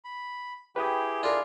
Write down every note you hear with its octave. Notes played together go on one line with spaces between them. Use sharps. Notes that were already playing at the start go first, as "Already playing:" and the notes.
B5
E4 G4 G#4 B4 G5 D#6
D4 F4 A#4